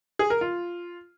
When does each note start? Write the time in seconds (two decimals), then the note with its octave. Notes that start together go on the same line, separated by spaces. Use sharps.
0.19 G#4
0.30 A#4
0.41 F4